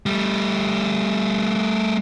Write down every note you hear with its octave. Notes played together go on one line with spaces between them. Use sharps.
G3 A3